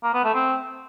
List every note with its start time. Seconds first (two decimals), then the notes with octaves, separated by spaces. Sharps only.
0.03 A#3
0.14 B3
0.24 A3
0.34 C4